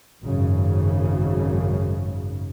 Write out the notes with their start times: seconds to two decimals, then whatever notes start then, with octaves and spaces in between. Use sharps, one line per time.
0.24 G#1 F#2 C#3